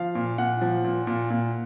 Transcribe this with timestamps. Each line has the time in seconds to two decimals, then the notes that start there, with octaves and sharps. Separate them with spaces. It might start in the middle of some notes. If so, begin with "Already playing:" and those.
Already playing: F3 F5
0.15 A#2
0.38 A#2 F#5
0.61 F3
0.84 A#2
1.07 A#2
1.30 A#2